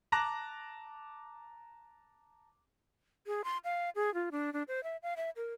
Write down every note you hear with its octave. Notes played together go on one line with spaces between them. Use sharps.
A5 A#5 D6 F#6 A#6
G#4
C6
F5
G#4
F4
D4
D4
C5
E5
F5
E5
A#4